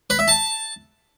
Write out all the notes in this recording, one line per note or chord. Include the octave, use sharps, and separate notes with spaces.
B4
E5
A5